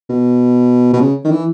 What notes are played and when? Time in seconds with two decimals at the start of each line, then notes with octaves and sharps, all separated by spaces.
0.09 B2
0.93 B2
1.00 C#3
1.25 D#3
1.31 E3